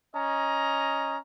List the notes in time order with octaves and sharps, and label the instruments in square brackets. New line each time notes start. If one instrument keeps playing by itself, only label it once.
[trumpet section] C#4 D#5 A#5